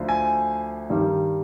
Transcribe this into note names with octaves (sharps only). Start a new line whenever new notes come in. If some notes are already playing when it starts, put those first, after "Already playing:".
Already playing: D2 D3 F3
G#5
G2 D#3 G3